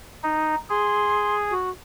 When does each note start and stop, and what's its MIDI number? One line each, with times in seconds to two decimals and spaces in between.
0.23 0.55 63
0.70 1.53 68
0.70 1.35 84
1.50 1.70 66